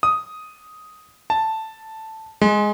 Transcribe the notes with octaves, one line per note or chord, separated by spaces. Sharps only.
D#6
A5
G#3